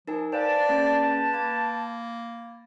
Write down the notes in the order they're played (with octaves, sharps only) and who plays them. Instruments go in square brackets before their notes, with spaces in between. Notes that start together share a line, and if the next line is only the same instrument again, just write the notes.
[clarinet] F3 [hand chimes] D#4 A#4 G#5
[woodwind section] B4 G5 A5 [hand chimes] C5 F5 [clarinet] D5
[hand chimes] A#3 C#4 G#4
[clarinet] A#3 [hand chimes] B5 G#6 A6